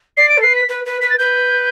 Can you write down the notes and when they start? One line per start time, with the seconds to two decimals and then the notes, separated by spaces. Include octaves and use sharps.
0.16 D5 C7
0.29 D7
0.37 A4
0.42 B4 C7
0.56 B6
0.68 B4
0.85 B4
1.01 B4 B6
1.10 A6
1.18 B4 G6